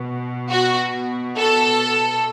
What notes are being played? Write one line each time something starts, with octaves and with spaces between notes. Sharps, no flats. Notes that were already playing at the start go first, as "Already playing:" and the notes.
Already playing: B2
F#4
A4